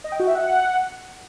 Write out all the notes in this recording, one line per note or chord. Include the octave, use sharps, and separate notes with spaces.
D#5
G5
F#4
E5
F#5